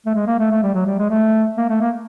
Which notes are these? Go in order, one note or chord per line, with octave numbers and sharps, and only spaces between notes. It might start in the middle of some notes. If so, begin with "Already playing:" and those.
A3
G#3
A#3
A3
A3
G3
F#3
G3
G#3
A3
A#3
A3
A#3